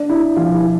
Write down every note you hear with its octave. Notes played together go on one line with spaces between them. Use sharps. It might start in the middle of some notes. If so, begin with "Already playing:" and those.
Already playing: D4
E4
F3 F4
E4